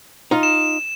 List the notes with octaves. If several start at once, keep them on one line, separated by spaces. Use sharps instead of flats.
D#4 F4
E7